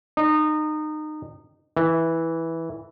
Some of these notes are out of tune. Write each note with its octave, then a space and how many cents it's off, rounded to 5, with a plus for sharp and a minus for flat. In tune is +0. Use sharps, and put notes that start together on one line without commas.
D#4 -25
E3 -10